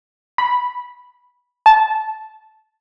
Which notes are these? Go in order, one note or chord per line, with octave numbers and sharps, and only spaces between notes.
B5
A5